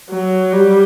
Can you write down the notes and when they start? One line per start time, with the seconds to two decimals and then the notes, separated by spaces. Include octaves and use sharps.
0.10 F#3
0.52 G3